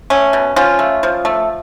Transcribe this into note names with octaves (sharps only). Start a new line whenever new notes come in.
A3 C#4
B2
F3 C#4 F4
A3
F3
A3